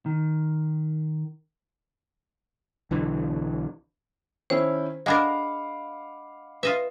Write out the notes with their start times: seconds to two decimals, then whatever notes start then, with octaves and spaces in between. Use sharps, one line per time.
0.06 D#3
2.91 B1 D3 E3
4.50 D#3 C#4 E4 C5
5.06 G#3 D4 A#4 D#5 F5 F#5 B5 D6
6.63 F4 B4 D#5 E5